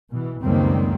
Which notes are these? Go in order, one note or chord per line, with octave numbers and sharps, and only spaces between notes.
B2 E3
C#2 F#2 D#3 G3 A#3 C4